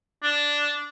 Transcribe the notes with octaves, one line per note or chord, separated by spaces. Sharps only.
D4